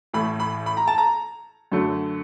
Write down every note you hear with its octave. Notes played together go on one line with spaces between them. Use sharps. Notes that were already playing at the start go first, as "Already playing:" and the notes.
A1 A2 E3 A3 B5
B5
B5
A#5
A5
A#5
F#2 D3 F#3 A3